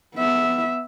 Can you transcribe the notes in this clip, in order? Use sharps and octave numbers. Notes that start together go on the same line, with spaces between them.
B3 E5